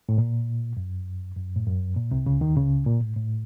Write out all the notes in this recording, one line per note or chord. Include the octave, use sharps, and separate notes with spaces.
A2
A#2
F#2
F#2
A2
F#2
A#2
C2 C3
C#2 C#3
D#2 D#3
C#2 C#3
A#2
A2
A2